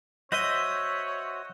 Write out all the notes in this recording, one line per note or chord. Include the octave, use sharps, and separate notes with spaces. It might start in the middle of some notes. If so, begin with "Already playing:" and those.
F#4 C5 C#5 D#5 E5